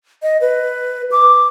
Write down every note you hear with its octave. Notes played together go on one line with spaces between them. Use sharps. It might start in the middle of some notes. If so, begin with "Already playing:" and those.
D#5
B4
D6